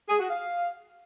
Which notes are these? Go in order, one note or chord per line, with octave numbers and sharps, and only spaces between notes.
G#4
F#4
F5